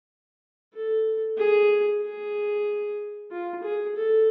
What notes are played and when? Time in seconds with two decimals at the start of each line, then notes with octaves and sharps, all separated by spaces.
0.74 A4
1.37 G#4
2.02 G#4
3.31 F4
3.63 G#4
3.96 A4